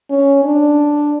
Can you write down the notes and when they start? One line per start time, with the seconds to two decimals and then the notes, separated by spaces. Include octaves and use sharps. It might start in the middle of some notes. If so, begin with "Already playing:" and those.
0.10 C#4
0.44 D4